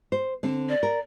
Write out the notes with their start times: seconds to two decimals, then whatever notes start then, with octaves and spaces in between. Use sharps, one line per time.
0.12 C5
0.43 D3 C4
0.69 D5
0.83 A#4